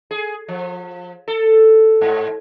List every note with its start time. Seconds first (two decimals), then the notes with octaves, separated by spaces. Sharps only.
0.11 G#4
0.48 F3
1.28 A4
2.01 G#2